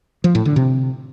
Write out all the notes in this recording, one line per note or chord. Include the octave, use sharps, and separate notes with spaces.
F3
A2
D3
C3